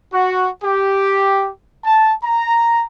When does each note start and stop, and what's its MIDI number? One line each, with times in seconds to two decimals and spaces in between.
0.11 0.49 66
0.62 1.49 67
1.84 2.13 81
2.23 2.84 82